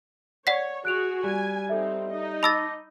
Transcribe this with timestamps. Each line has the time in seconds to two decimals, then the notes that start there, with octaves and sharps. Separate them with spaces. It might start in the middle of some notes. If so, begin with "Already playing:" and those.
0.47 C#5 D5 F#5 B6
0.85 F#4 G#4 F#6 D7 F7
1.24 G3 G#5
1.69 C4 D#4 A4 E5
2.10 D#4 D#5
2.43 A5 B5 D6 E6 A6 A#6